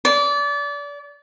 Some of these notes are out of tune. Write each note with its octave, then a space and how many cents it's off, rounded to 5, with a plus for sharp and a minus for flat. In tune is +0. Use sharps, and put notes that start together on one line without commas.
D5 -30